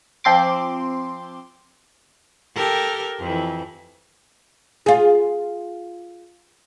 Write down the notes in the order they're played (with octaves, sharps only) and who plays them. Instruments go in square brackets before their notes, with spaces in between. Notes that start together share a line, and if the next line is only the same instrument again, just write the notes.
[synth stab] F3 C4 C6 D6
[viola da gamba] G4 A4 A#4
F2 E3
[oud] F4 G#4